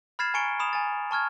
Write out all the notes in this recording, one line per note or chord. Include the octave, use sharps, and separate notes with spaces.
B5 F6 G#6 A6 C7 E7
G#5 A#5 C#6 C#7 D7 G7
B5 D#6 E7 F7
G#5 A6
A5 C#6 F6 G#6